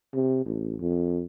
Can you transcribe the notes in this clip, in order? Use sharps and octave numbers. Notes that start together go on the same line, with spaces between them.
C3
A1
F2